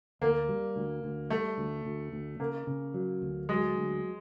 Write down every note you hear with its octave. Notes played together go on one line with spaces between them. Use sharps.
D2 A#3
G3
D2
D2
G3 A3
D2
D2
D2
C#3 A#3
C#3
F#3
D2
F#3 G#3
D2